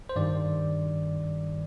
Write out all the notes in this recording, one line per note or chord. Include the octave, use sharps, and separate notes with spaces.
C5
G2 D#3 G3 D5